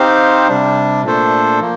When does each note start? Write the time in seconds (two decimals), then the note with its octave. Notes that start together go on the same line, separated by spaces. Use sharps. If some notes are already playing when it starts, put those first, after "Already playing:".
Already playing: C4 D#4 G4 C5 F5
0.48 C3 G3 D4
1.04 A#2 A3 D4 A4 C5
1.60 F3 A#3